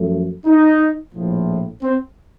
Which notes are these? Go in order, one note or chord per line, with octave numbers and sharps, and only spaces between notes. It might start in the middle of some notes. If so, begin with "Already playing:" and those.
Already playing: F#2 F3 A3
D#4
A#1 A2 F3
C4